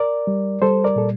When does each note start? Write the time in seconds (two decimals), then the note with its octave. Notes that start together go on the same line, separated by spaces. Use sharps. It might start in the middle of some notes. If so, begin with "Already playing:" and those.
Already playing: A#4 D5
0.27 G3
0.62 G3 A4 C5
0.84 A#4 D5
0.96 A#2 A4